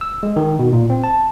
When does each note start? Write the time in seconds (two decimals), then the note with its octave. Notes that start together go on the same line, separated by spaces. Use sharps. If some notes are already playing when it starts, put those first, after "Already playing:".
0.01 E6
0.23 G#3
0.36 D#3
0.59 B2
0.73 A#2
0.90 C4
1.04 A5